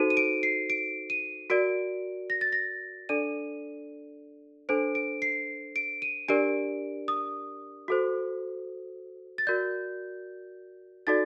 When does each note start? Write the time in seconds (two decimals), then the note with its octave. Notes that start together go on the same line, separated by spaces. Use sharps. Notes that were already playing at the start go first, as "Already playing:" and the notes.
Already playing: D#4 F#4 A4 C5 D#7
0.10 D#7
0.17 D7
0.43 C7
0.70 D7
1.10 D#7
1.50 F#4 A#4 D5 D7
2.30 A#6
2.41 A6
2.53 A#6
3.09 D4 A4 D5 D#7
4.69 D4 A4 C5 D7
4.95 D7
5.22 C7
5.76 D7
6.02 D#7
6.28 D4 G4 A#4 D5 D7
7.08 D#6
7.88 F#4 A4 C5
9.38 A6
9.47 F#4 A#4 D5 G6
11.07 D#4 F#4 A4 D5 A6